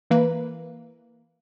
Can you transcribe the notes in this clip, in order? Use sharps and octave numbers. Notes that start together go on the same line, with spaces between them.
E3 A#3 B4